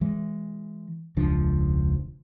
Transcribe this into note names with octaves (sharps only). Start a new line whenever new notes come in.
E3 G#3
E1 C#2 F3 D4